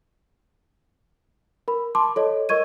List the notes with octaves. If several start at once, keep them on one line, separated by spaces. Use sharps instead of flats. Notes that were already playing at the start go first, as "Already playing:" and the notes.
A#4 B5
A5 C6 D6
A4 C#5 D#5
A#4 D#5 C#6 G#6 D#7